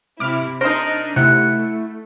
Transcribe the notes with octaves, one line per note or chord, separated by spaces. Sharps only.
C3 E4 D6 F6
D4 D#4 A#4 C5 D#5
C3 A3 E4 F#5